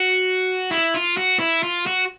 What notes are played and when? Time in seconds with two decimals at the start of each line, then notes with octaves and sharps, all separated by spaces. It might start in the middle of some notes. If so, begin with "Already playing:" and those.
Already playing: F#4
0.71 E4
0.94 F4
1.17 F#4
1.39 E4
1.63 F4
1.86 F#4